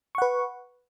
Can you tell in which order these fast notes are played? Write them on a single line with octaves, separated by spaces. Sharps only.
C#6 F#5 B4